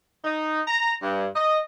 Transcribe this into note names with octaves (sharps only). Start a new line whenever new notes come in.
D#4
A#5
G2
D#5